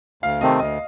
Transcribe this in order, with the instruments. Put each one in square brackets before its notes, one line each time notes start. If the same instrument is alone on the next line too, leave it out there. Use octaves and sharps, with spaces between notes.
[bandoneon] D2 [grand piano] F5
[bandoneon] C3 D#3 A3 C4 [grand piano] D#5
[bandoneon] D2 [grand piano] D#5